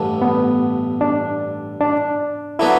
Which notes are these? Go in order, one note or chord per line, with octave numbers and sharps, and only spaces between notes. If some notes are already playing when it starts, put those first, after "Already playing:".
Already playing: A1 G2 D3 A3
B3
D4
D4
D3 F#3 B3 E4